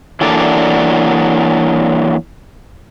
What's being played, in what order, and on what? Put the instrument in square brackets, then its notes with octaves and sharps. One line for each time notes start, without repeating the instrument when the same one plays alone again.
[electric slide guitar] E3 F#3 A#3 D4 A4 D5